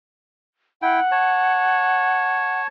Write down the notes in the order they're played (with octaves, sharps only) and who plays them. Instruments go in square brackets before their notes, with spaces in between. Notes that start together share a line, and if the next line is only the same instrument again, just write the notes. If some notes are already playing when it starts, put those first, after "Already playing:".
[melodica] E4 G5 [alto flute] F#5
[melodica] C#5 A5